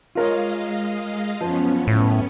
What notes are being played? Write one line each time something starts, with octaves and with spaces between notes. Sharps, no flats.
G#3 F4 A#4 C#5 D#5 F5
F#2 F3 B3 C#4
A2